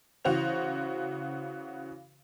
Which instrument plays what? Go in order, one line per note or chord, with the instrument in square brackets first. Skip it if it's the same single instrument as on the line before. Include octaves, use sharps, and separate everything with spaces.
[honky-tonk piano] C#3 E3 F#4 C5 F7